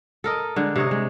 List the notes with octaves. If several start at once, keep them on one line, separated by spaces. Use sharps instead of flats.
A4 A#4 D#5
D3 G#3
C3 C#5 D#5
G#3